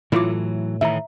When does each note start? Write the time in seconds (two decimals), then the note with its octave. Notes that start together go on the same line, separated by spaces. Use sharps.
0.12 A2 E3 F#3 E4 F4 D6
0.81 A2 D#3 E3 E5 A#5